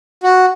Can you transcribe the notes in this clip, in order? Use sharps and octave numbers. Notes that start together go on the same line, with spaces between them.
F#4